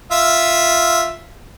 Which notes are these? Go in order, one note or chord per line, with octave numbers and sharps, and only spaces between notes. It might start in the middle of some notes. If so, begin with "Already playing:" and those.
F4 E5